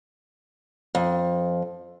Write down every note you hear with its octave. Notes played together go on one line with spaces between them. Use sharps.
F2